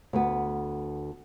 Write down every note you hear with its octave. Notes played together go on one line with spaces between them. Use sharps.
D2 B3